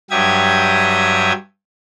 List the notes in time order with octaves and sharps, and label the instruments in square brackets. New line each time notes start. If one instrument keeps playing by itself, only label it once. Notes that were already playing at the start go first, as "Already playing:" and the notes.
[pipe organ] G2 F#3 G4 E5 D#6 G#6